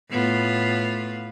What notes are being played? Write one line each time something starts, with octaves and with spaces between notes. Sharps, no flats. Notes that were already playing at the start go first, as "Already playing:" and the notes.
A2 B3 F4